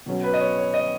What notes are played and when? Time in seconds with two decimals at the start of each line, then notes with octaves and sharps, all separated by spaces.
0.06 B2 F#3 C#4
0.23 B4
0.34 D#5
0.41 C#5
0.58 C#5
0.74 D#5